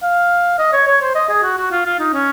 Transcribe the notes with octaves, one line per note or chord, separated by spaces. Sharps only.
F5
D#5
C#5
C#5
C5
D#5
G#4
F#4
F#4
F4
F4
D#4
C#4